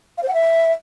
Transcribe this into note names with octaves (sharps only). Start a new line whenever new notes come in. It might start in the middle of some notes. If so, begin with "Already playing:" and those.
F5
C5
F#5
E5